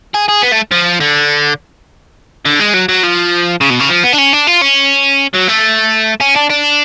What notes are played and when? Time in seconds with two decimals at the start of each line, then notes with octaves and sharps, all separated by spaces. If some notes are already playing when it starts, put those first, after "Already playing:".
0.14 G#4
0.29 G#4
0.43 B3
0.52 A3
0.72 F3
1.00 D3
2.46 D3
2.60 G#3
2.74 F#3
2.89 F#3
3.03 F3
3.61 C#3
3.70 B2
3.80 C#3
3.90 F3
4.04 B3
4.13 D4
4.19 C#4
4.33 D4
4.47 F4
4.62 C#4
5.35 F#3
5.49 A3
6.20 C#4
6.36 D4
6.50 D4